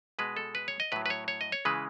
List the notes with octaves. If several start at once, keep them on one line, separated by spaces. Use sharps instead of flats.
B2 G#3 B4
A4
B4
C#5
D#5
A2 F#3 B4
B4
C#5
C#5
D#5
C#5
C#3 E3 G#3 B4